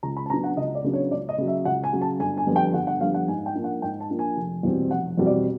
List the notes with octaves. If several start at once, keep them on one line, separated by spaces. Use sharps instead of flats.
C#2 A#5
B5
A5
C#3 F#3 B3 D4 A#5
F#5
C#2 D#5
D5
C#3 F#3 B3 D4
C#5
C#2 D5
D#5
C#3 F#3
E5
C#2 F#5
G#5
C#3 F#3
A5
G1 G#5
G#5
F2 D3 G3 B3
G5
G1 F#5
F#5
F2 D3 G3 B3 F5
F#5
G#2 G#5
G5
F3 A#3 D4
F#5
G#2 G5
A5
F3 A#3 D4
G#5
F1
E2 B2 G3 C4
F1 F#5
E2 B2 G3 C4
D5